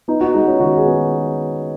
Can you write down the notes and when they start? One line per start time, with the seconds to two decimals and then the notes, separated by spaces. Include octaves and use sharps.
0.08 B3 D#4
0.21 F#4
0.34 G#3 D#4
0.47 C#4
0.60 D#3 F#4
0.77 G#4
0.86 B3